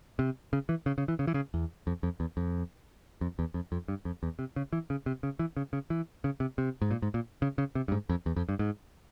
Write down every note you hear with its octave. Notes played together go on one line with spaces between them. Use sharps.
C3
C#3
E3
C#3
C#3
E3
C#3
E3
C#3
E2
F2
F2
E2
F2
F2
E2
F2
F2
G2
F2
E2
C3
C#3
E3
C#3
C3
C#3
E3
C#3
C#3
E3
C#3
C3
C3
G#2
A#2
G#2
A#2
C#3
C#3
C3
G2
G#2
F2
E2
F2
G2
G#2